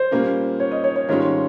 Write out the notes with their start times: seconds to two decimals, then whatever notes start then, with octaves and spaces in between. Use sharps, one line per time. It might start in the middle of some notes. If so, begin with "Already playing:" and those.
Already playing: C5
0.11 A#2 G3 A#3 C#4
0.60 C#5
0.72 D#5
0.84 C#5
0.96 C#5
1.08 G#2 D#3 G3 C#4 F4 C#5